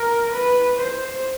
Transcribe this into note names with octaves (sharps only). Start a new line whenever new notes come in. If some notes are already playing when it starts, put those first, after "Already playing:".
Already playing: A#4
B4
C5